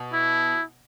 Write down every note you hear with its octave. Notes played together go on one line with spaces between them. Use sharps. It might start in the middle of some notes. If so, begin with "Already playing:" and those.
Already playing: B2
E4